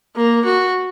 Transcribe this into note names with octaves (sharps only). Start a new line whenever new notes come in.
A#3
F#4